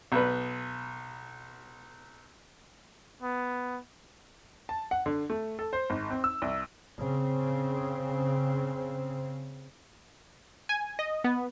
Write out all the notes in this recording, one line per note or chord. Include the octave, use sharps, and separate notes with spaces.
B1 B4
B3
A5
F#5
D3
A3
A4
C5
G#1
C4
E6
C2
C#3 C4
G#5
D#5
B3